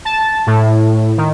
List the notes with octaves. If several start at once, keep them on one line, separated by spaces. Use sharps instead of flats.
A5
A2
D#3